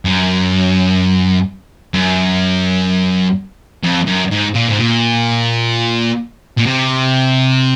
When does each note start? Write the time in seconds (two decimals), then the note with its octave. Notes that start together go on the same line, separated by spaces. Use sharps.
0.05 F#2
1.94 F#2
3.84 F2
4.07 F#2
4.31 G#2
4.55 A#2
4.68 G#2
4.78 A#2
6.58 A#2
6.67 C3